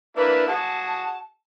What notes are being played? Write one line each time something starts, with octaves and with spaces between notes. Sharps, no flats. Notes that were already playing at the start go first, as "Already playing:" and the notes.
A#3 D4 E4 B4
F#4 G#4 A5